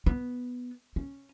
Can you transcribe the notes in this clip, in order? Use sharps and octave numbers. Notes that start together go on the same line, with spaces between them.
B3
C#4